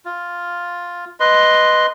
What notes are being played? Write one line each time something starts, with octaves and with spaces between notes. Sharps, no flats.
F4
B4 D#5 C6